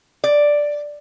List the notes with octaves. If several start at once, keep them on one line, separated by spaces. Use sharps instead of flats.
D5